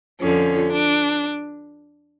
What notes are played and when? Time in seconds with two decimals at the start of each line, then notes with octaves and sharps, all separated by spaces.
0.21 F2 D3 F3 C#4
0.73 D4